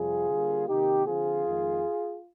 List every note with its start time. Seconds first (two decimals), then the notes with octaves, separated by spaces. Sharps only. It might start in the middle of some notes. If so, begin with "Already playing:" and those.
Already playing: F2 C3 G3 F4 G#4
0.29 D3 G3 A#3
0.68 C3 D#3 A#3 D#4 G4
1.07 D3 F3 C4 F4 G#4
1.46 F2 D#3 G#3